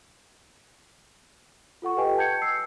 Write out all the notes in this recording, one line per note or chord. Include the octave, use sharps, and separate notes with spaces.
F4 A4 F#5 C#6
G4 A4 B4 D#5 G5 G#5
A5 G6 G#6 C#7
E6 C7